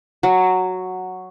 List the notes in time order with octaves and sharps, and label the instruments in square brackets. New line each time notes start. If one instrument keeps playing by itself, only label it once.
[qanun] F#3